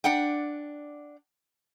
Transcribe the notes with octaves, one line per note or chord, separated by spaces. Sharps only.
D4 F#5 G5